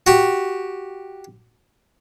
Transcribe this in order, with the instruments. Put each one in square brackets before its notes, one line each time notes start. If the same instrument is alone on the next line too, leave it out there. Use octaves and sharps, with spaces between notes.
[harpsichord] F#4 G4